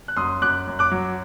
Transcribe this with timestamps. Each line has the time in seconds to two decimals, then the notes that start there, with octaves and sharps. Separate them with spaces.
0.08 F#6
0.17 F#2 C6 D#6
0.42 F#2 D6 F#6
0.67 F#2
0.79 D6 F#6
0.92 F#3